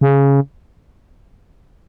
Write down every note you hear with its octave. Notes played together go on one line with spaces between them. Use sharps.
C#3